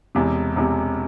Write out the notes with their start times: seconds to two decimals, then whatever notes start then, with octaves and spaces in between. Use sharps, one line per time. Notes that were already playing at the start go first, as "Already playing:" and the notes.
0.15 E1 E2 C3
0.56 E1 E2 C3